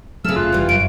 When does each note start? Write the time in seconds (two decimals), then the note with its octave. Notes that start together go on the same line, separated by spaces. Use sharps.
0.24 C#3 F#3 A3 C4 E6 F6
0.36 F1 F4 F#6
0.53 E3 G3
0.69 F#2 D7